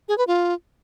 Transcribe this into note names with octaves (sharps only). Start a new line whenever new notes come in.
G#4
B4
F4